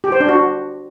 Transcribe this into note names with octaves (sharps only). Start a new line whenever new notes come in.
G4
C5
D4
F#4